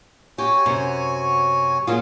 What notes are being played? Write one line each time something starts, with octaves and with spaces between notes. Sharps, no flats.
F#4 G4 C#5 G#5
F#2 C3
F#3 A#3 C#4 F4 G#4